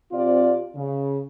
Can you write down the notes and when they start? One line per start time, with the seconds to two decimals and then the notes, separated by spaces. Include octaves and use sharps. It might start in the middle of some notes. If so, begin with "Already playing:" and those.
0.12 C3 C4 F4 D5
0.76 C#3